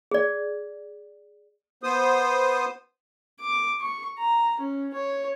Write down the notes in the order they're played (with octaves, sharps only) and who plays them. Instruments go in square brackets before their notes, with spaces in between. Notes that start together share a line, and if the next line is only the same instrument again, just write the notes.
[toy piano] G#4 D5
[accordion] B3 C5 D#6
[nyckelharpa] D6
C#6
A#5
C#4
C#5